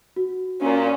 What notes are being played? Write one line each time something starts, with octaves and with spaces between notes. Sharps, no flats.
F#4
A#2 C#4